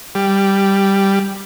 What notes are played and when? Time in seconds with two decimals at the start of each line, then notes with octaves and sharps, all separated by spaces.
0.15 G3